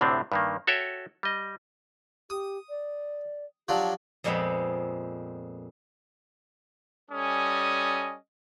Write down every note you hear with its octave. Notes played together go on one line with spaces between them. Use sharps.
D2 A2 C3 C4 D4
G2 D#3 A#3
F#4 A4 C#5 E5 G5
G3 D#5
G4 D#6
D5
F3 F#3 D4 G4
F2 A#2 G#3 B3 C4 B5
G3 C#4 A4 D#5 G#5 D#6